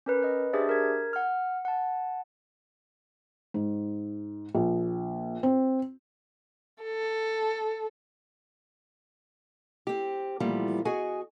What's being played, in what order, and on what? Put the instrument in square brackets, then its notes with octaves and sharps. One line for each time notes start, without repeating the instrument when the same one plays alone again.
[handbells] C#4 A#4 B4
B4 D#5
D4 G4 G#4 C5 D5 E5
A#4 G#6
F#5 F6
F#5 A5
[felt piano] G#2
A#1
C4
[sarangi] A4
[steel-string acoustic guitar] C4 G4
A#2 E3 F3 G3 A3 B3
F#4 G#4 D#5 F#5 G#5